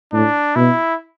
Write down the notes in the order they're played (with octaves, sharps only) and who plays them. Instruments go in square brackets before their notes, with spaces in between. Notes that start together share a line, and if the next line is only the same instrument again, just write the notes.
[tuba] A2 [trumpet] D4
[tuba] B2 [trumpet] E4